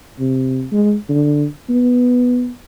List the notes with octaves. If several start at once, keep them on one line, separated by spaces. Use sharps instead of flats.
C3
G#3
D3
B3